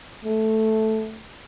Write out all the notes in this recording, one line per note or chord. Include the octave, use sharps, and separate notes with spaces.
A3